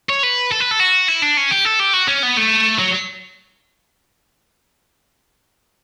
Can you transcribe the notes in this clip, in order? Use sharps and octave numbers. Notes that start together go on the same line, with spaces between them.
C#5
B4
A4
B4
A4
F#4
E4
D4
C#4
G4
A4
G4
F#4
C#4
B3
A3
F#3